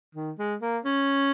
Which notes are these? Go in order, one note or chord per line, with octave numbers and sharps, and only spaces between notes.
D#3
G#3
A#3
C#4